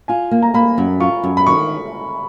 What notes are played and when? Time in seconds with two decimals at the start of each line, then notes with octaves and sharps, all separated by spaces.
0.08 F4 G#5
0.31 A#3
0.42 A#5
0.54 A#3 B5
0.78 F#2
1.00 F4 C#6
1.24 F#2
1.37 B5
1.46 D#3 C#6